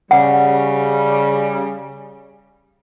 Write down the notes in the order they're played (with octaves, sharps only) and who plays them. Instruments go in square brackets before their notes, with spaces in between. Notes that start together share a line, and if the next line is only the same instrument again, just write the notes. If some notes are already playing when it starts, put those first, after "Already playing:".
[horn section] C#3 G3 [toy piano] F#5